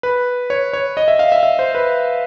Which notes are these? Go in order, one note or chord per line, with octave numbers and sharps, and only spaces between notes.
B4
C#5
C#5
D#5
E5
F5
E5
E5
C5
B4